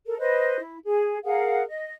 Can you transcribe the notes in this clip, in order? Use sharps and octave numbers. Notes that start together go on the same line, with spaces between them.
A4 A#4
B4 C5 D#5
E4
G#4
G#4 A#4 F5 F#5
D#5